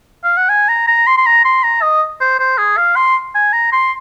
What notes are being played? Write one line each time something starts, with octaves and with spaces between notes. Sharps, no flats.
F5
F#5
G#5
A#5
A#5
C6
C6
A#5
C6
A#5
D#5
C5
C5
G#4
F5
C6
G#5
A#5
C6